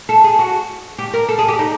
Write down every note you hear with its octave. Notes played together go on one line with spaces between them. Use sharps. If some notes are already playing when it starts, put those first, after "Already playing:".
A4
G#4
F#4
G4
A#4
A4
G#4
G4
D#4